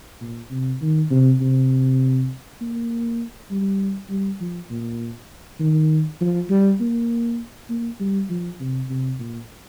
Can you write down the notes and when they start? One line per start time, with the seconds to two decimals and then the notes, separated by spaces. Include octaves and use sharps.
0.21 A#2
0.50 C3
0.81 D#3
1.11 C3
1.41 C3
2.61 A#3
3.51 G3
4.10 G3
4.40 F3
4.70 A#2
5.60 D#3
6.21 F3
6.50 G3
6.80 A#3
7.69 A#3
8.00 G3
8.30 F3
8.60 C3
8.89 C3
9.19 A#2